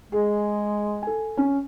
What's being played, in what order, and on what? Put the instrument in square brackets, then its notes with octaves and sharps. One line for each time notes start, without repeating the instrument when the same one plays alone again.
[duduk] G#3 [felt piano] G#4
[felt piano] A4 G#5
C#4